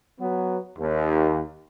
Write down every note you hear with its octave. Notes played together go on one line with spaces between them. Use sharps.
F#3 B3
D#2